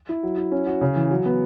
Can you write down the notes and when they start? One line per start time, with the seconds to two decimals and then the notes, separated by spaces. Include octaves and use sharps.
0.09 E4
0.23 F#3
0.38 E4
0.52 C#4
0.67 F#4
0.81 C#3
0.96 E3
1.11 F#3
1.26 B3